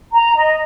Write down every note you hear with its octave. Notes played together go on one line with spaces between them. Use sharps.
A#5
D#5